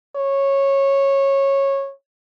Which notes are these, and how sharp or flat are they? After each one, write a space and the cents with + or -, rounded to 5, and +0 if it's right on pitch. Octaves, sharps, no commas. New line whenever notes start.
C#5 -15